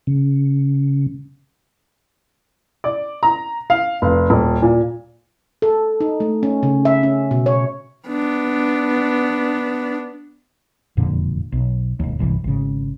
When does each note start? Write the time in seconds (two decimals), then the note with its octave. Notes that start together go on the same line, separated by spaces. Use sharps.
0.07 C#3
2.84 D5
3.23 A#5
3.70 F5
4.02 F1
4.30 D#1
4.62 A#2
5.62 A4
6.00 D#4
6.20 A3
6.43 C#4
6.63 C#3
6.85 E5
7.03 C#4
7.31 B2
7.46 C#5
8.08 B3 D4
10.97 E1 F2 A#2 D3
11.52 B1
12.00 E1 D#2
12.19 G1 C2 C#3 E3
12.44 G#1 C#3